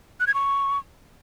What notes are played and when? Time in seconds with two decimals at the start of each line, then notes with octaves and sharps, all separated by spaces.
0.20 F#6
0.27 G#6
0.34 C#6